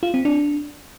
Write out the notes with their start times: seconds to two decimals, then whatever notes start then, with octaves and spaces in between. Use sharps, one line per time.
0.03 F4
0.14 C4
0.25 D4